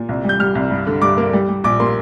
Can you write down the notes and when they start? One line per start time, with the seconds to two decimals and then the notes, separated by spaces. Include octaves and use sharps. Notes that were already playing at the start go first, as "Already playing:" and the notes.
Already playing: A#2
0.09 C2
0.24 G3 G6
0.40 G3 F6
0.55 C2
0.71 G2
0.87 D3
1.02 G2 D6
1.18 A#3
1.33 G3
1.49 G3
1.64 A#1 D6
1.80 A#3 C6